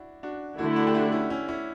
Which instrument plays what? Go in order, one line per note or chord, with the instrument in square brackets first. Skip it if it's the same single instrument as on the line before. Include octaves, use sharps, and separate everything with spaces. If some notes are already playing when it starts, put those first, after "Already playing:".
Already playing: [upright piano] D4 E4 F#4
D4 F#4
[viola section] D3 A3 E4 [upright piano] D4 F#4
[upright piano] D4 F#4
G4
D4 F#4
C#4 E4
C#4 E4
C#4 E4